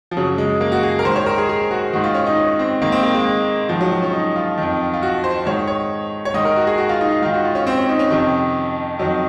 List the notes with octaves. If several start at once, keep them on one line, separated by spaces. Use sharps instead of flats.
F3
F#2 C#3 F#3
G#3
A#3
F#4
G#4
A#4
G#2 D#3 C5
C#5
A#4
G#4
G#4
F#4
G#2 D#3 F#4
F4
C#4
D#4
C#4
C4
G#2 D#3 A#3
C4
A#3
G#3
G#2 D#3 F3
F#3
F#3
C#4
D#4
F4
F2 D#3
F4
F#4
C5
G#2 D#3 C#5
C#5
C#5
G#2 D#3 D#5
A#4
F#4
G#4
F#4
F4
D#4
F4
G#2 D#3 F4
F#4
F4
C#4
C4
C#4
D#4
C#4
F2 C3 D#3
F2 D#3 F#3